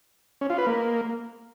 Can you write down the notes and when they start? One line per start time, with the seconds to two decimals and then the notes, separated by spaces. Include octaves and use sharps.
0.41 C#4
0.50 F4
0.58 B4
0.67 A#3